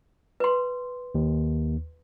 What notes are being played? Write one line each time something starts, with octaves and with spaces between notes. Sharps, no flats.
B4 C6
D#2